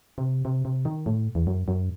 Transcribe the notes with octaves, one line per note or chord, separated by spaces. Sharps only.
C3
C3
C3
D#3
A2
E2
F#2
F#2